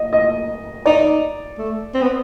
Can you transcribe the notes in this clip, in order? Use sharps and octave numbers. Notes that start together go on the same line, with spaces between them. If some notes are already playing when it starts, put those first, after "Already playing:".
Already playing: D#5
D#5
D#4 D5
A3
C4
B3